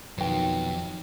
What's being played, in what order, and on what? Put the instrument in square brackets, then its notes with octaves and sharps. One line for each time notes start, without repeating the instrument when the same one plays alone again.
[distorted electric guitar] F2 [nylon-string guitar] B2 G5 [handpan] D#3 F#3